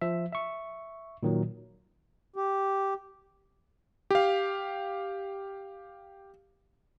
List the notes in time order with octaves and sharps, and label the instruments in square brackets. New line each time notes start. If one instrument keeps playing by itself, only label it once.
[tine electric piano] F3 E5
E5 C#6
A#2 D#3 F#3
[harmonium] G4
[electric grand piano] G4 F5